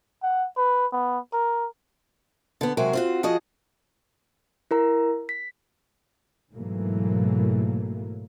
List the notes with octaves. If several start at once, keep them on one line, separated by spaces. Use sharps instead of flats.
F#5
B4
B3
A#4
D3 B3
C3 F#3 G#3 F#4 A#4
C4 F4 F#4
F3 F#4 G#4 D#5
E4 A#4 A#5
B6
G#2 B2 E3 F#3 A3 A#3